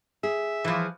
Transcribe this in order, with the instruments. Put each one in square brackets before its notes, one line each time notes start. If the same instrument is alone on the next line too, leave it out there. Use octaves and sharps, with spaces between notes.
[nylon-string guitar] G#4 [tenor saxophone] E5
[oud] E3 F3